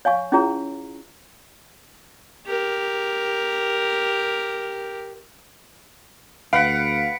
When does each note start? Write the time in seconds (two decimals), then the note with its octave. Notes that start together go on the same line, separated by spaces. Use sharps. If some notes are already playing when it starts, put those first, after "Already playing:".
0.05 C#5 F5 G#5 C#6
0.32 C#4 E4 F4 G#4 C#5 A#5
2.47 G4 A#4
6.53 D2 B4 F5 F#5 B6 C#7 D7